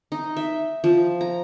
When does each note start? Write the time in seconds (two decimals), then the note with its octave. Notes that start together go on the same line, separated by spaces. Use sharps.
0.12 D#4
0.37 E5
0.84 F3
1.21 A#5